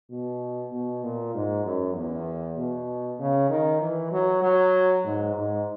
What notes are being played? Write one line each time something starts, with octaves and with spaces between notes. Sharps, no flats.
B2
B2
A#2
G#2
F#2
E2
B2
C#3
D#3
E3
F#3
F#3
G#2
G#2